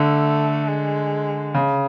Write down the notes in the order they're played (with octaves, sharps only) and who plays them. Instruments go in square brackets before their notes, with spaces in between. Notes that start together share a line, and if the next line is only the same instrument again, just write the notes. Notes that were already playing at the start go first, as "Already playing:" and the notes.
Already playing: [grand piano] D3 [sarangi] A3
[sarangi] G#3
[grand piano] C#3